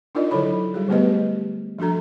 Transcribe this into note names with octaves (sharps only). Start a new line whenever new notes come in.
D4 D#4 F4 A#4 D5 D#5
D3 F#3 E4 A4 C#5 B5
G3 F#4 G#4
D3 A3 B3 G4 B4 D#5
F3 D4 F#4 A4 A#5